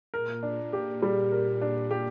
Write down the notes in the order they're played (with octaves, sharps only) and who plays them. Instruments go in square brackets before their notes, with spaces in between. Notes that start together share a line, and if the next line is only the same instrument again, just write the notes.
[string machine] A#2 [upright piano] A#4
[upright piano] D4
G4
G3
A#4
D4
G4